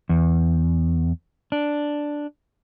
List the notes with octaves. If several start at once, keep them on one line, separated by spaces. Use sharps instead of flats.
E2
D4